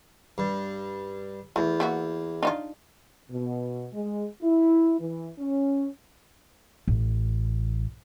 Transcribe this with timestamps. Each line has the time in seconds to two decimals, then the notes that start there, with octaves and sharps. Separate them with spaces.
0.38 G2
1.56 E2 A3
1.80 A#3 E4 F#4
2.43 D4 D#4 F4
3.30 B2
3.93 G#3
4.42 E4
5.00 E3
5.39 C#4
6.87 A1